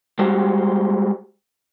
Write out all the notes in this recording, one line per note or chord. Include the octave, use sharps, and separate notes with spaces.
G3 G#3 F#4 G4 C5